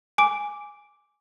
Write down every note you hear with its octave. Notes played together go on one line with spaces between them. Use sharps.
G#5 D6 D7